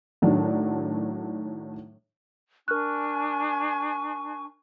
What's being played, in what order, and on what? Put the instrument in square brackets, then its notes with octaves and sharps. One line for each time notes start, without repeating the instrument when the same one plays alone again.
[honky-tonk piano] A2 D#3 F#3 D4
[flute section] D4 G#5 C#6 [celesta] A#4 F6 F#6